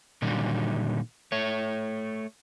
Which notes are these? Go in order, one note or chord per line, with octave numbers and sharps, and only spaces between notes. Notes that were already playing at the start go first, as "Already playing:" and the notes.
A#2 D3 D#3 F#3 G3
A3 C#5